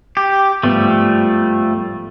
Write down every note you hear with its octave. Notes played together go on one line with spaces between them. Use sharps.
G4
G#2 F3 G3 A3 B3